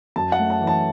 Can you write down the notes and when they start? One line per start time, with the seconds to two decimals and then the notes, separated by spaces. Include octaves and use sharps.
0.16 F#2 A5
0.32 F#5
0.39 A3
0.50 A5
0.61 E3
0.67 A5